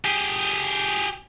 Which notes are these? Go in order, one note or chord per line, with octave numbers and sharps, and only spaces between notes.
G4 G#4